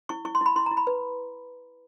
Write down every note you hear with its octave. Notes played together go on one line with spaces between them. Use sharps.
E4 C#6
E4 C#6
C6
E4 B5
E4 C6
E4 A#5
B5
B4